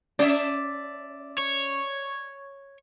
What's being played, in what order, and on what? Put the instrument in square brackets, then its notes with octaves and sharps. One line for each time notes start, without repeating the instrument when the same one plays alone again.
[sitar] C#4 E5 [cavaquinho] D5
[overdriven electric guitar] C#5